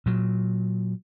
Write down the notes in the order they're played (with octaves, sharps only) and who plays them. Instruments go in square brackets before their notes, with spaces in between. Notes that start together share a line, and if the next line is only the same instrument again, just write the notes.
[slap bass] A#2 F#3